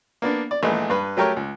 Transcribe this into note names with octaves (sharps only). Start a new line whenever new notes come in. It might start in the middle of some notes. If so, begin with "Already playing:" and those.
A#3 B3 D4
D5
A#1 E3 G#3 A3
G2 B4
F#3 A3 G4 A#4 C#5
C#2